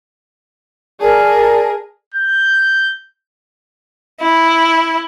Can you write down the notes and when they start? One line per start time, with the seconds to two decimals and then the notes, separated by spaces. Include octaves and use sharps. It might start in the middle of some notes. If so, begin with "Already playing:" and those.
1.00 G#4 A#4 D5 A5
2.14 G6
4.23 E4